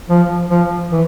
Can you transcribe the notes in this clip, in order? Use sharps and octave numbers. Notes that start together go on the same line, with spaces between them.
F3
F3
E3